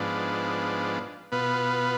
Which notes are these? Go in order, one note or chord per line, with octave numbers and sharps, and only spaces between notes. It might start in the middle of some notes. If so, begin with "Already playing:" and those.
Already playing: G#2 F3 B3 D4
B2 B3 F4 B4